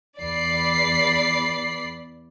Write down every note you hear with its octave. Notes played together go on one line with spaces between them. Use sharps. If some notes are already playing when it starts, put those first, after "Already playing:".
E2 D5 B5 C7